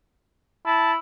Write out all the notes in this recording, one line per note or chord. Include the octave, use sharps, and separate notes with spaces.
E4 A5